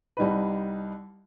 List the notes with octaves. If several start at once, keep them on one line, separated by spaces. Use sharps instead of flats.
C2 G3 D#4 B4